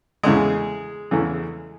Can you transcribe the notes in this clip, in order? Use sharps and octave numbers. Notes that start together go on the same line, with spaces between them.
E2 C#3 E3 G#3 A3 G#4
E2 C#3 E3 A3